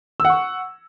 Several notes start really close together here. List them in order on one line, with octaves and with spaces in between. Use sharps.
E6 F#5 C#6